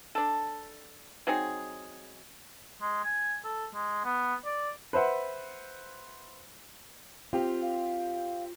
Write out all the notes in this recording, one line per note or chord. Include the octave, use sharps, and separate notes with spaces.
D4 A4
F#3 C4 D#4 G#4
G#3
G#5
A4
G#3
B3
D5
B4 C5 E5 F#5
C4 F4 G4
F5